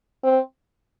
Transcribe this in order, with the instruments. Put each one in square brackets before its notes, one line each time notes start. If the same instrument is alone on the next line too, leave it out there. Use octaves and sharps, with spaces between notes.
[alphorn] C4